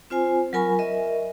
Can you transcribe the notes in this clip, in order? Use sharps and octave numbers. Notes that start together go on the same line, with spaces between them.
C4 F4 C5 G#5
F#3 F4 A#4 G#5 B5 C#6
A#4 D#5 E5